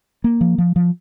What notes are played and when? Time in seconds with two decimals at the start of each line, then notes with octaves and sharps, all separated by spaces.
0.24 A#3
0.41 F3
0.58 F3
0.76 F3